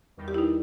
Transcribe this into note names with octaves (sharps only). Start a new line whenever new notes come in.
E2 D#3 G3
G4
E4
D#4